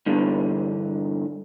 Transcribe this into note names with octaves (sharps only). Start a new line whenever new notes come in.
G2 D3 E3